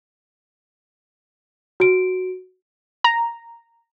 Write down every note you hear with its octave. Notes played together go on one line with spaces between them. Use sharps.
F#4 D7
A#5